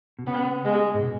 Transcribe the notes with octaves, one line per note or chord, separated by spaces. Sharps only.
B2
C#3 B3
G#3
G#2
B2